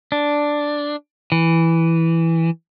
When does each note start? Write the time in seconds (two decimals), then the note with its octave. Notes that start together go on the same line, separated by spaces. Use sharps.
0.12 D4
1.32 E3